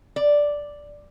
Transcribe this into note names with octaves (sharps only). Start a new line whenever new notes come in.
D5